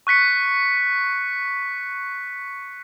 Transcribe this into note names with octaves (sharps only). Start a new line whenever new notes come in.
C#6 F#6 B6 C#7